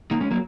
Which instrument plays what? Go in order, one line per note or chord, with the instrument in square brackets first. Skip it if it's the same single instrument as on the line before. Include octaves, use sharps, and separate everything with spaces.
[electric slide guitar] A#3 D#4
G#3 C#4
F#3 A#3